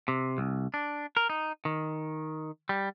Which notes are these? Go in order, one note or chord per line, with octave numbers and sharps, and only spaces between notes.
C3
C2
D4
A#4
D#4
D#3
G3